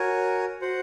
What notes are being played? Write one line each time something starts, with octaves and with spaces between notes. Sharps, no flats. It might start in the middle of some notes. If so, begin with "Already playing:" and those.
Already playing: F#4 A#4 C#5 G#5
F#4 C5 F#5